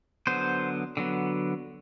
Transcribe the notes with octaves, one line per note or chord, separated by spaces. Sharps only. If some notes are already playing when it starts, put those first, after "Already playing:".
D3 F#3 B3 C5
D3 F#3 B3